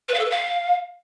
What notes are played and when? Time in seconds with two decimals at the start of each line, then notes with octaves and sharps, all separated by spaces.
0.08 B4
0.14 F5
0.19 A4
0.25 B4
0.30 F5